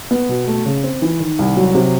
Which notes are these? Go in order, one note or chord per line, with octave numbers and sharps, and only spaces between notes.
B3
B2
A3
C#3
C4
E3
D#3
C2
F#3
C3